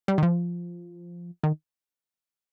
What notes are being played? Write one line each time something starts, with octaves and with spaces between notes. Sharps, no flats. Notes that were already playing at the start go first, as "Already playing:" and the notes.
G3
D#3
F3
D#3